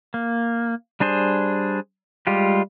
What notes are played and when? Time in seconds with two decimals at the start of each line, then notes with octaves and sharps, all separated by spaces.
0.14 A#3
1.00 G3 D4 G#4 C5
2.27 G3 G#3 F4 G4